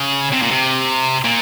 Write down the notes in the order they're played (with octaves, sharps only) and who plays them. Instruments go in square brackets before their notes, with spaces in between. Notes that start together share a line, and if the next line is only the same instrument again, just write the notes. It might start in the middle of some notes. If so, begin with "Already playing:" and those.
Already playing: [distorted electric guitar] C#3
C3
A#2
C3
A#2